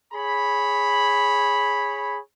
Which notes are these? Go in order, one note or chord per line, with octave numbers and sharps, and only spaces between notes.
G#4 C#5 B5